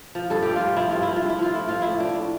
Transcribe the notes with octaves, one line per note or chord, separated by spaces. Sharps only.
F3
G2 A4
F3 G4
F4
G2
F3 E4
G2 F4
E4
F3
F4
G2
E4
F3 F4
A2 E4
F3 F4
A2 E4
F3 D4
A2